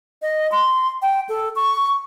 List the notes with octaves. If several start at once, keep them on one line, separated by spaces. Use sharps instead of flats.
D#5
C6
G5
A4
C#6